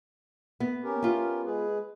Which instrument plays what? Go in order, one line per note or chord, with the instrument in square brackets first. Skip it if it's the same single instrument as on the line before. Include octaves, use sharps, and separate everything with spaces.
[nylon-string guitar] B3
[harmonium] C#4 G4 A#4
[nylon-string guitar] B3 F4
[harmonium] G#3 G#4 B4